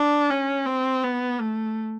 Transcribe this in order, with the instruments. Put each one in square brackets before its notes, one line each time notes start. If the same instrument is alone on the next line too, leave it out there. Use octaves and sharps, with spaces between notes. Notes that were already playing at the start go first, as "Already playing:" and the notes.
Already playing: [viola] D4
C#4
C4
B3
A3